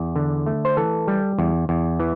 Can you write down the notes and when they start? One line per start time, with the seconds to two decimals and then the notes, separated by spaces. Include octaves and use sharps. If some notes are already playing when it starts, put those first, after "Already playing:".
Already playing: E2
0.16 D3
0.46 A3
0.65 C5
0.77 E3 A4
1.08 G3
1.38 E2
1.69 E2
2.00 E3